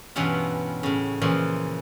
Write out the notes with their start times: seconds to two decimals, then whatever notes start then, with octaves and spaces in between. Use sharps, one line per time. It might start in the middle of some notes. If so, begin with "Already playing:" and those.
0.16 G2 B2 E3 B3 C#4 F4
0.83 A2 C#3
1.22 A#2 C#3 E3 F3